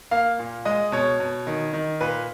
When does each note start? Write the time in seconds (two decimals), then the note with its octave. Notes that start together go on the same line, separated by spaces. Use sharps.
0.11 A#3 F5
0.39 A#2
0.65 G#3 D#5
0.92 B2 C#5
1.20 B2
1.47 D#3
1.73 D#3
2.01 A#2 B4